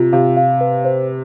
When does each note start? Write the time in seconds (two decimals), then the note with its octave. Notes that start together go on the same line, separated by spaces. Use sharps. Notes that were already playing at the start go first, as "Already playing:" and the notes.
Already playing: C3 F4
0.13 C3 F5
0.37 F5
0.61 B4
0.85 C5